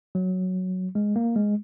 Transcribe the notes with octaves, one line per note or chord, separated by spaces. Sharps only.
F#3
G#3
A#3
G#3